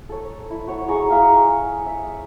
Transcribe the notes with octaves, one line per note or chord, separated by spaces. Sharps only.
A4 C#5
E4
F#4 C#5
G#4 A#5 C#6
G#4 E5 F5
E5